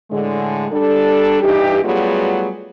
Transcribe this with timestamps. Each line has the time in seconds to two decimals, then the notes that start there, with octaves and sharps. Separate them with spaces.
0.11 A2 D3 G#3
0.71 G3 D4 A4
1.42 G2 E3 D#4 G4
1.84 F#3 G3 A3 B3 F4 G#4